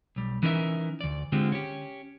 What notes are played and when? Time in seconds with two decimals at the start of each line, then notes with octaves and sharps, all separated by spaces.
0.16 B1 G3
0.43 E3 C#4 D#4 A#4 B4 E5
1.01 D2 D5
1.32 D3 G#3 C4 F4 G4
1.52 C#4 G4